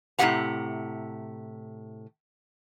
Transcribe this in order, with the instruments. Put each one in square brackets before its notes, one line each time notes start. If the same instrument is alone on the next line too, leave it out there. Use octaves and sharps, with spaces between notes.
[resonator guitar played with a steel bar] A2 C3 G3 G4 F#5 A#5